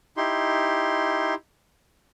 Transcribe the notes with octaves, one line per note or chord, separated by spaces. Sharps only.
D#4 E4 G4 C6